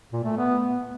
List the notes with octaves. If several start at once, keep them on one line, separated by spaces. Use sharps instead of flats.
A#2
A3
B3